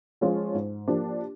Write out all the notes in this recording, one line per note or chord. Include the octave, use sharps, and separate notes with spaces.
F3 G#3 C#4 F4
G#2
F3 A#3 D4 G4